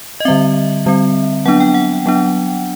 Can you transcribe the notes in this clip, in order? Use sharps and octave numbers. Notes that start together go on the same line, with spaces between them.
D#5
D3 G3 C4 E5
D3 G3 C4
F#3 B3 D4 F#5
G5
F#5
F#3 B3 D4